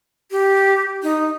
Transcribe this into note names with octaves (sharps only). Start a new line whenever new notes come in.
G4
D#4